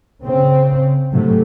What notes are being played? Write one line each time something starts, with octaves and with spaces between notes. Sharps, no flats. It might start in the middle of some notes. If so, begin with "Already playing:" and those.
C#3 C4
G#2 C3 F#3 A3